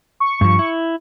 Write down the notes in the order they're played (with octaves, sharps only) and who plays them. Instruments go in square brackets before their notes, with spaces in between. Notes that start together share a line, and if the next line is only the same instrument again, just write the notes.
[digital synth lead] C#6
[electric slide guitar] G2 F3
E4